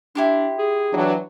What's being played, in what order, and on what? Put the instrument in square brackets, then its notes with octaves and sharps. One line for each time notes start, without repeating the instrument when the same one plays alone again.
[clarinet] D4 [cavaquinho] E4 G4 C6
[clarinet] G#4
[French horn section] E3 F#3 D4